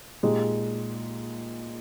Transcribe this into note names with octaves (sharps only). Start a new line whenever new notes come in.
A#2 G#3 D#4 G4